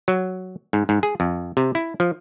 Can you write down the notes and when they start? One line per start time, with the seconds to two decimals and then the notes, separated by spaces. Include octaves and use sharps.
0.08 F#3
0.73 G#2
0.89 G#2
1.03 G#4
1.20 F2
1.57 C3
1.75 E4
2.00 F3